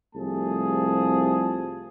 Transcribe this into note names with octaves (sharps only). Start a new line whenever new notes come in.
C2 F3 A3 G4 G#4 A5